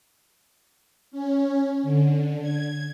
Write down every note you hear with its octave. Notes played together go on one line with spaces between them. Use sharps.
C#4
D3
G#6